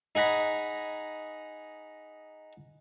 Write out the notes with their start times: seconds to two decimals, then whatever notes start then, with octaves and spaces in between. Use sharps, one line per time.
0.15 D#4 G#4 F#5 A#5 B5